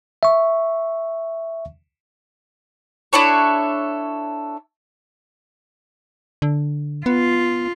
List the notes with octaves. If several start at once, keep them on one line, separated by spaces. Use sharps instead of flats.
E5 C#6
D4 E4 A4 C#5
D3
B3 F4